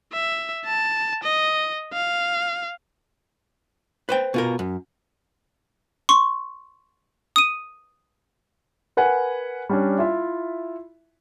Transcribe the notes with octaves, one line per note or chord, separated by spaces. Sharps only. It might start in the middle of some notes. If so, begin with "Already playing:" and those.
E5
A5
D#5
F5
B4 C5 G5
B2 F4 A#4
F#2
C6 C#6
D#6 D#7
A#4 B4 F#5 G#5
G3 C#4 D4
E4 F4 E5